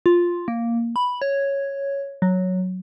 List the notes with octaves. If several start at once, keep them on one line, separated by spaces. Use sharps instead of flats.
F4
A#3
B5
C#5
F#3